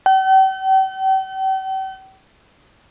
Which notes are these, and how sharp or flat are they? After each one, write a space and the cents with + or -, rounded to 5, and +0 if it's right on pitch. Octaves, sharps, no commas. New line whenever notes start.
G5 -45